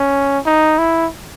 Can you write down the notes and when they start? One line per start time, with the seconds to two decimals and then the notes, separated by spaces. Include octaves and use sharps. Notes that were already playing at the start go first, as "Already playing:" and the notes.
Already playing: C#4
0.46 D#4
0.78 E4